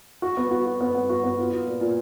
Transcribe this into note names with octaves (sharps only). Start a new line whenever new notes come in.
F#4
B3
F#4
F#4
B3
B3
F#4
B3
F4
F4
A#2
A#2